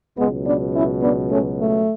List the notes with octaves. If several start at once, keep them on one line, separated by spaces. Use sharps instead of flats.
C#2 B2 F#3 G#3 B3
B3 D4
C#4 E4
B3 D4
A3 C#4
A3